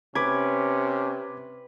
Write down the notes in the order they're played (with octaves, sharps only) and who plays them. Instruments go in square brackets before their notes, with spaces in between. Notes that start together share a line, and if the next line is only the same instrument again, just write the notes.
[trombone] C3 [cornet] C#4 [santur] B4 [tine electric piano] D6 G#6